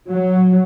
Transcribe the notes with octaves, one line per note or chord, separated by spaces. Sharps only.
F#3